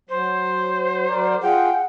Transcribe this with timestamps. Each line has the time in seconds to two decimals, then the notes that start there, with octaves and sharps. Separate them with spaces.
0.09 F#3 C5
1.07 F#3 A#4 D5
1.43 F4 G#4 F#5 G5